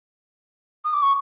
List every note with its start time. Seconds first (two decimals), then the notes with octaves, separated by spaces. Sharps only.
0.84 D#6
0.93 D6
1.02 C#6